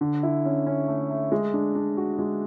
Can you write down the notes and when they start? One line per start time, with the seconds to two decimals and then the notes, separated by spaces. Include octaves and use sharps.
0.01 D3
0.23 E4
0.45 C#4
0.67 C#4
0.88 A3
1.10 A3
1.32 G#3
1.53 D4
1.75 D4
1.97 F#4
2.19 G#3